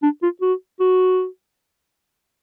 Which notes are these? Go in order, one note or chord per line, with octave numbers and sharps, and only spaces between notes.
D4
F4
F#4
F#4